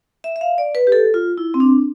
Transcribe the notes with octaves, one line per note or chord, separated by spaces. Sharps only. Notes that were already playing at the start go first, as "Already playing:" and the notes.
E5
E5
F5
D5
B4
G4
A4
F4
E4
C4
D4